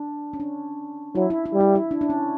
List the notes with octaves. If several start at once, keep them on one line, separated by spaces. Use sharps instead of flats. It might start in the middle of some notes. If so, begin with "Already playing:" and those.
Already playing: D4
C#4
D4
F#3 E4
E4
E4
G3
E4
E4
D4
D4
C#4